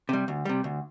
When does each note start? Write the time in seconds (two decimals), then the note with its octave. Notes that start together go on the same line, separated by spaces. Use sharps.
0.09 C3 G3
0.28 D2
0.45 C3 G3
0.64 D2